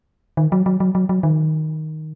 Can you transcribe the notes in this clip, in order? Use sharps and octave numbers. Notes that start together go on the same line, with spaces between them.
D#3
F#3
F#3
F#3
F#3
F#3
D#3